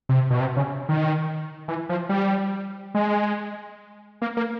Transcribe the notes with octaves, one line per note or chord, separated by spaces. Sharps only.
C3
B2
C3
C#3
D#3
E3
F3
G3
G#3
A#3
A#3